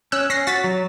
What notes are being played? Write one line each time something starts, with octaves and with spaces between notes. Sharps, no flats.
C#4 E6 F#6
C#4 A#6 C7
F#4 A6 B6
F#3